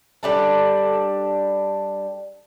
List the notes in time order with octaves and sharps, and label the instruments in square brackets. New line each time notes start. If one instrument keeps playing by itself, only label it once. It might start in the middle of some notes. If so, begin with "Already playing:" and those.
[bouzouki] G3 D4 A4